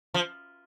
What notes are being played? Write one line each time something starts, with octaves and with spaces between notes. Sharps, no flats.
F3